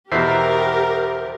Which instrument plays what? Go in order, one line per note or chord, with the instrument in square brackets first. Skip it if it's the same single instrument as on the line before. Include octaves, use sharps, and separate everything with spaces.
[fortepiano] E2 B2 [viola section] G4 A#4 [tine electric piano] C5 E5 C7